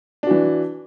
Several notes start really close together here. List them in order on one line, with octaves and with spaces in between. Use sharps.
D4 F#4 E3